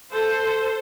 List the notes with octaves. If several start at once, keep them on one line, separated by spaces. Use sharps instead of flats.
A4 C5